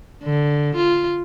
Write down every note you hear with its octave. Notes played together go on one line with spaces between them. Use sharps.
D3
F4